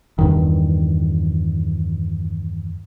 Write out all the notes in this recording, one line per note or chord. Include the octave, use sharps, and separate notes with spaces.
E2 G2 D#3